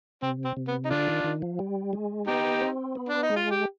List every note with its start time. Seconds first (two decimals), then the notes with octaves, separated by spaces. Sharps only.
0.22 C3 C4
0.45 C4
0.57 C3
0.68 B3
0.85 D#4
0.90 D3 D4 F4
1.07 D#3
1.24 D#3
1.42 F3
1.59 G3
1.93 G#3
2.27 B3 D#4 G4
2.61 C4
2.95 B3
3.09 D4
3.23 D#4
3.30 G#3
3.36 F4
3.51 G4